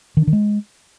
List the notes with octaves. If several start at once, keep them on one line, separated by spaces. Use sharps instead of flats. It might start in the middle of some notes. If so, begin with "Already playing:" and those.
D#3
D4
D#3
G#3